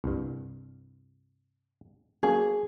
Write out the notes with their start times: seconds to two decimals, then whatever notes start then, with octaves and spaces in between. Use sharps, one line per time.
0.04 C2 G2
2.23 F#3 A#3 C#4 G#4